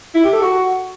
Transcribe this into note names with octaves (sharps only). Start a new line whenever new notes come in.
E4
G4
A4
F#4